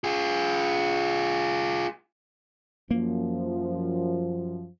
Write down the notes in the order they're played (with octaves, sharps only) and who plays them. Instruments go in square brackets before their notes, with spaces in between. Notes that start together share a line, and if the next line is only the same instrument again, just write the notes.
[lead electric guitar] F4 G#4
[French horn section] F#2 F3 [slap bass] A#3